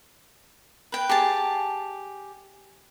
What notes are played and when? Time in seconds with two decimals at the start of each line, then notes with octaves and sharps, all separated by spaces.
0.92 B4 G5
1.09 G4 G#4 A5